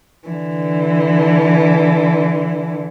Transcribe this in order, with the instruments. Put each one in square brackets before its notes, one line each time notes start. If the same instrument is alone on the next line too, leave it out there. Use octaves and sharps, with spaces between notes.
[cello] D3 E3